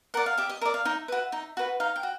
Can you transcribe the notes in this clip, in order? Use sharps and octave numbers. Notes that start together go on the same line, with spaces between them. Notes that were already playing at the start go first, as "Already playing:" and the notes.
A#4 D5 F#5
F5
G4 E5
D#5
A#4 D5 E5
F5
D#4 E5
F#4 B4
D#4
F#4 B4
D#4 F5
G5
F#4